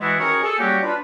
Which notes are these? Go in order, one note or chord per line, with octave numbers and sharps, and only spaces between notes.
B2 E3 G#3 B3 E4 F#4
D#3 C#4 F#4 G#4 A#4 C#5
G#4 A4
F#3 G3 A#3 C#4 F#4 G4
D4 F4 B4